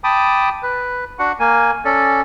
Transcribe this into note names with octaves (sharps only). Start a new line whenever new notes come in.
G5 A5 B5 D6 D#6
B4
D4 F#4 F#5
A#3 G#5
C#4 A4 D5